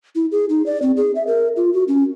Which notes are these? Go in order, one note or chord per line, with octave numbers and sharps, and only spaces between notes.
E4
G#4
D#4
D5
C4
G#4
E5
A#4
F4
F#4
C#4